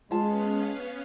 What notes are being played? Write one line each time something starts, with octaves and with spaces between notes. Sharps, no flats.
G#3 B3 C#4 F4 F5 A5